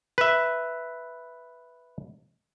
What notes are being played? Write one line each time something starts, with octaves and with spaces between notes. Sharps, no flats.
B4 E5